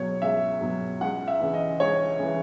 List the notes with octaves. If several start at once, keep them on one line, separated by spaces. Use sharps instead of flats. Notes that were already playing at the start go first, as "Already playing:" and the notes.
Already playing: C#2 B2 F#3 C#5
C#2 E5
B2 F#3
C#2 F#5
E5
C#3 E3
D#5
C#2 C#5
C#3 E3